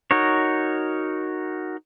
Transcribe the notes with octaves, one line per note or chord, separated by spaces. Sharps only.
D#4 F#4 A#4 C#5